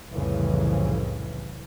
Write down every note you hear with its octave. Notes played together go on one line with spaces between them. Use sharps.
C2 F2 A2 C#3 E3